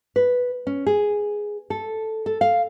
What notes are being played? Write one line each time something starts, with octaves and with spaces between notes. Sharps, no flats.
B4
C#4
G#4
A4
A4
F5